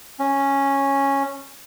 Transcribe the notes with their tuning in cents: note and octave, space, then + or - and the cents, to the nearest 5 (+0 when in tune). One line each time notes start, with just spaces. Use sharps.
C#4 -5